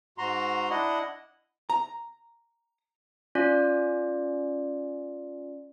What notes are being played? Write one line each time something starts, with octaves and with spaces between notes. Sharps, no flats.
G#2 F#4 A#5 C6
D4 E4 D#5 F#5
A#5
C#4 F4 D5